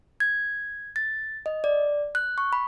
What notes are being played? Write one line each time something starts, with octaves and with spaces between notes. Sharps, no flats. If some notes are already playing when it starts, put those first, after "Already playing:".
G#6
A6
D#5
D5
F#6
C#6
B5